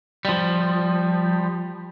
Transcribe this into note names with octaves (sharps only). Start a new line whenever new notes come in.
F3 G3